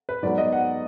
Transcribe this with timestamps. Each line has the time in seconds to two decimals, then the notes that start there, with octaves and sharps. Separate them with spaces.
0.09 B4
0.23 G#2 F#3 B3 D5
0.38 D#5
0.53 F#5